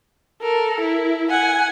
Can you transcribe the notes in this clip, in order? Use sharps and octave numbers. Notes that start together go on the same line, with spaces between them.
A4 A#4
E4
F#5 G#5